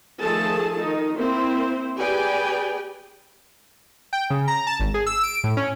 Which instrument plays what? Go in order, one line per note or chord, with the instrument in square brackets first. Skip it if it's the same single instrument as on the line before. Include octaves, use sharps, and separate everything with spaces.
[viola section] D#3 F3 A3 G#4 A4 A5
D#3 D#4
A#3 C4 E4 C5
G4 G#4 B4 D5 G5 G#5
[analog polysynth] G5
C#3
A#5
A5
G#1
G#4
E6
D7
A2
C#4